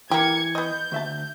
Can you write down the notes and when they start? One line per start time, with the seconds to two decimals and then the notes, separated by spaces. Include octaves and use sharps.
0.11 E3 A#3 G4 G#6 C#7
0.55 B3 D#5 G6
0.92 D2 E5 A5